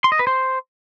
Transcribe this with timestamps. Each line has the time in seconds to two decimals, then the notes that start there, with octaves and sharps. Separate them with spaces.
0.04 C6
0.12 D#5
0.19 B4
0.27 C5